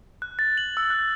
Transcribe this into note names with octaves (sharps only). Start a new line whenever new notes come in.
F#6
A6
F#7
E6
F#6